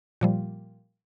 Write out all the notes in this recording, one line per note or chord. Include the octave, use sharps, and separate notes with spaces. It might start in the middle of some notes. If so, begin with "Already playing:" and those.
A#2 F3 G3